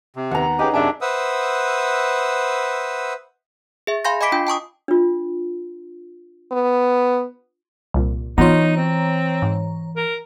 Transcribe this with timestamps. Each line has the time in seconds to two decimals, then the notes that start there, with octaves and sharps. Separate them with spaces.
0.16 C3
0.31 D#2 B3 F#5 A#5
0.59 C#4 D#4 G4 G#4 B4
0.74 F#2 C3 D4 G#4 E5 A5
1.01 B4 C5 E5 F#5 D#6 E6
3.87 G#4 E5
4.05 F5 G#5 B5 C6 G6 A#6
4.21 D#5 G#5 B5 D6 B6 D7
4.32 D4 F4 G5
4.47 G5 A5 C#6 D#6
4.88 D4 F4
6.52 B3
7.94 C2 A#2
8.38 E3 B3 D#4 F4 C#5 A#5
8.77 C4
9.42 G#2
9.97 A#4